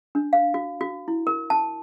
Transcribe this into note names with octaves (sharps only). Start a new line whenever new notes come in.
D4
F5
F#4
F#4
E4
A#4
A5